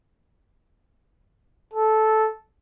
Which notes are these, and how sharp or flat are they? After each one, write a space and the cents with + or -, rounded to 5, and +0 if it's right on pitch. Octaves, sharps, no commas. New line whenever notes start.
A4 -10